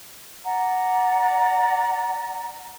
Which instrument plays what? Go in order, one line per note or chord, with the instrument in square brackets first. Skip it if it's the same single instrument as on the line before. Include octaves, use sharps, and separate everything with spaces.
[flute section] D5 F#5 A#5